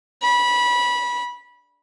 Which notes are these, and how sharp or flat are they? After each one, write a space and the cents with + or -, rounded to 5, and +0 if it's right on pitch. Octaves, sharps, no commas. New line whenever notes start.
B5 -20